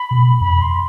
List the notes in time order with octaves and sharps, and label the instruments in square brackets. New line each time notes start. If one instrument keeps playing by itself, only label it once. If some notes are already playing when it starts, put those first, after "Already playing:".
Already playing: [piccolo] B5
[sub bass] B2
[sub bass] F2 [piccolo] B5
[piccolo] C6